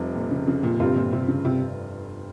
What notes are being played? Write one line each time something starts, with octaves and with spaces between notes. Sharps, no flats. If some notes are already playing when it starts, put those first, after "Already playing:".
Already playing: F1 F2 C3 G3
A#2
C#3
C#3
A#2
G1 G2 C3 G3 C4 F4
A#2
C3
C#3
C3